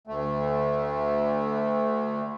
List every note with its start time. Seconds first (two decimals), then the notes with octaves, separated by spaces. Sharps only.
0.07 D2 A3